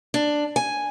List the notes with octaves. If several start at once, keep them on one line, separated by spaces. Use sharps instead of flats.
D4
G#5